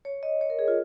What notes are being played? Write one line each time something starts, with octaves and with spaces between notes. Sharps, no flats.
C#5
D#5
C#5
A#4
G#4
F4